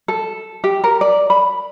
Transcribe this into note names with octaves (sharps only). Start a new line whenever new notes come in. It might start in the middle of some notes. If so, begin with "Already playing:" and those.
A4
G4
A#4
D5
B5